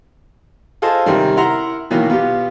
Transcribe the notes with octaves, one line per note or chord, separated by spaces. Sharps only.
F4 G#4 A4 C5 D#5
C3 D#3 G3 C#4
E4 A#4 F#5 A#5 C6
B2 D#3 E3 F#3 A#3
B2 B3 F4 G4